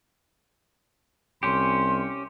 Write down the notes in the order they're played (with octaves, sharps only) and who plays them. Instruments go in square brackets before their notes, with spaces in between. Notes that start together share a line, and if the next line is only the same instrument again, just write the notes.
[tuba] C2 [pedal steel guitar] C#4 G4 [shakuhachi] C6